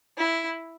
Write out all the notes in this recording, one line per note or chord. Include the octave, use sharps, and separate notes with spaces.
E4